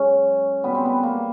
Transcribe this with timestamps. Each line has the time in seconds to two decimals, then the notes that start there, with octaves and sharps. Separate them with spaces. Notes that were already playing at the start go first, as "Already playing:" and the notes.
Already playing: F#2 G#3 C#4
0.64 B2 G3 B3
0.75 C4
0.85 B3
1.03 A#3